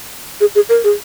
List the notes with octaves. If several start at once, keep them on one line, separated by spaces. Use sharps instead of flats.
G#4
G#4
A#4
G#4